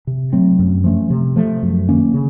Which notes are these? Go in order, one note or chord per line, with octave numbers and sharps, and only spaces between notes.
C3
F#3 A3 C4
F#2
F3 A3 C#4
C3
F3 A3
F#2
D#3 A#3 C#4
C#3